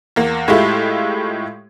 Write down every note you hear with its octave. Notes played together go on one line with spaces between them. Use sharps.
E2 A#3
A2 G#3 A3 E4 F4 G4